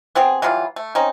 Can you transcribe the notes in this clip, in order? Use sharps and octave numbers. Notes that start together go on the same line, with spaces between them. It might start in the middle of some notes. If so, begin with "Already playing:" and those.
B3 C4 G4 G#4
E3 F#3 G3 F4
A3
C4 C#4 D#4